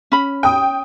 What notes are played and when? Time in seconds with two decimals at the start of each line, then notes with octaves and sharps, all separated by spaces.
0.12 C#4 B5
0.43 G5 D#6